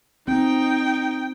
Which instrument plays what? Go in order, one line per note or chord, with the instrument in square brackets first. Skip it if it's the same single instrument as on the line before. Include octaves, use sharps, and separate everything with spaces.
[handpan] C4 [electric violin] D#4 [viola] G5